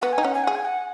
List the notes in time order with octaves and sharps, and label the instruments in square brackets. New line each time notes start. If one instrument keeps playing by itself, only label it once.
[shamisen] B3 [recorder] F#5
[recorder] G#5
[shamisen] D#4
[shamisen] C#4 [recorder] F#5
[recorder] G#5
[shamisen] G#4 [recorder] F#5
[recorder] G#5
F#5